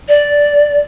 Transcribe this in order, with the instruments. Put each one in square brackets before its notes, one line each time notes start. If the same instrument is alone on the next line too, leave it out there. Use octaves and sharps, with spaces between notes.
[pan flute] D5